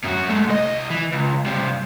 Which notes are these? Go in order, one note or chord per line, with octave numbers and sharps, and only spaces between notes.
F#2 F#4
G#3 A3
C2 D#5
E3
C#2
G2 C3